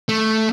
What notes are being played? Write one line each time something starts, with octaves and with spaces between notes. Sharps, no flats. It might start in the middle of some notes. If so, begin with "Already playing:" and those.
A3